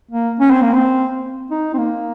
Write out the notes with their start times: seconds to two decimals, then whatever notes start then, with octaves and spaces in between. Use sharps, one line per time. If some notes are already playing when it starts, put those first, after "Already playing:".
0.11 A#3
0.40 C#4
0.51 C4
0.62 A#3
0.74 C4
1.51 D#4
1.74 C4
1.78 A#3